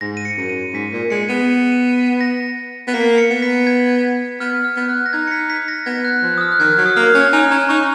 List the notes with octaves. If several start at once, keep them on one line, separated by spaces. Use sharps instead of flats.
G#2 A#6
D#7
C#7
F#2
D#7
G#2 B6
A#2 B6
G#3 C#7
B3 D#7
C#7
D#7
A#6
B3
A#3 B6
C#7
B3
B6
G#6
B3 F6
F6
B3
F#6
A#6
D#4 G#6
C#7
B6
B6
A#6
B3 G#6
F#6
F3
D#6
F6
F#6
D#3 G#6
F#3
D#6
A#3 F6
C#4
D#4 G#5
C#4 A#5
D#4 C#6